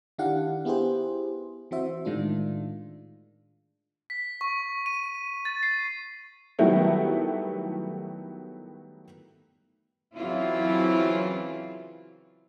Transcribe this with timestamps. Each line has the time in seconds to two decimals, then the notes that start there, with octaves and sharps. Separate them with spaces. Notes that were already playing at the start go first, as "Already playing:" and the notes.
0.18 D#3 D4 E4 G4 F5 F#5
0.65 B3 E4 G4 G#4 C5
1.71 E3 C4 F#4 C5 E5
2.05 A2 D#3 G#3 D4 F4
4.10 B6
4.41 C#6
4.86 D#7
5.45 A6
5.63 C7
6.59 D#3 F#3 G3 A3 B3 E4
10.15 C#3 E3 F#3 C4 E4 F4